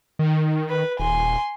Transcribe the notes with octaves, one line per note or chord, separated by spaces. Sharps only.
D#3
B4
D#1 G#5 C6